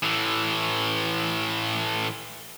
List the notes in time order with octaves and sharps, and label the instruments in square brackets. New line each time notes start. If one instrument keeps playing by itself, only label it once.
[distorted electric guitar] A2 E3